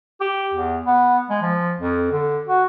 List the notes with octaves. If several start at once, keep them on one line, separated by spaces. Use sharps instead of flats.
G4
E2
B3
G#3
F3
F2
D3
F#4